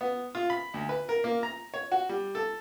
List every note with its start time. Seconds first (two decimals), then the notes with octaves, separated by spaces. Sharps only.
0.01 B3
0.35 F4
0.50 B5
0.74 D2
0.89 B4
1.09 A#4
1.24 A#3
1.43 A#5
1.74 C#5
1.92 F#4
2.09 G3
2.35 A4